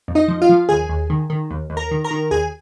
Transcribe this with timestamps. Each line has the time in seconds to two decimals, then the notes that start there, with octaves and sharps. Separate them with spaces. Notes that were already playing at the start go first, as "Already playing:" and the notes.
0.08 F2
0.15 D#4 D#5
0.28 F3
0.42 F4 F5
0.49 F3
0.69 D#2 G#4 G#5
0.89 D#2
1.10 D#3
1.30 D#3
1.51 D#2
1.70 D#2
1.77 A#4 A#5
1.91 D#3
2.04 A#4 A#5
2.11 D#3
2.31 D#2 G#4 G#5